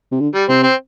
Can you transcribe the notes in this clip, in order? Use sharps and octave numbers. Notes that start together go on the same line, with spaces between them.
C3
D3
G3
C3 C4
C4